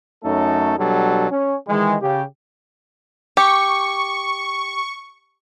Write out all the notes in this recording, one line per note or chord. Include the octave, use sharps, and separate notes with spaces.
F#2 A3 C#4 D#4 A4
B2 F#3 G3 D4 A4
C#4
D#3 E3 G#3
C#3 G4
G4 C#6